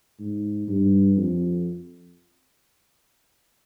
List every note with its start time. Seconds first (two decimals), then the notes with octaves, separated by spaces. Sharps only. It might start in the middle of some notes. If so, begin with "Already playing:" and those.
0.20 G#2
0.68 G2
1.17 F2